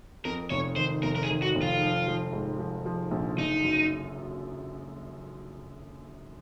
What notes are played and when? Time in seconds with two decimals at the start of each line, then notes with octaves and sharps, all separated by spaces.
0.25 F2 A#4
0.50 F1 C#5
0.76 D#3 C5
1.03 F1 A#4
1.15 A#4
1.23 G#4
1.29 D#3
1.42 F#4
1.55 F1
1.61 F4
1.81 F3
2.08 F3
2.33 G#2
2.59 F3
2.86 F3
3.11 A#1
3.37 F#1 D#4
3.64 F#2